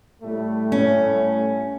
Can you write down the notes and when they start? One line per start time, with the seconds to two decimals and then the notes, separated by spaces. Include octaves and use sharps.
0.22 A2 G3 A3
0.72 C#4